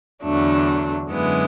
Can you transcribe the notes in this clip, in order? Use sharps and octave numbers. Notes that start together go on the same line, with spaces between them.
E2 D3 F#3 A3 D4
F#2 D3 G#3 B3 E4